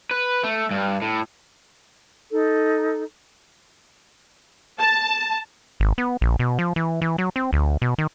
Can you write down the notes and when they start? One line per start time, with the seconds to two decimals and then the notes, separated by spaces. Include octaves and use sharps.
0.11 B4
0.44 A3
0.71 G2
1.02 A2
2.31 D#4 A4
4.80 A5
5.80 G#1
5.98 B3
6.21 A#1
6.39 B2
6.59 F3
6.76 E3
7.02 E3
7.18 F#3
7.36 C4
7.53 D2
7.82 B2
7.98 D#3